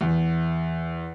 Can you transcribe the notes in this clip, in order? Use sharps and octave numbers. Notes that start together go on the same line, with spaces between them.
E2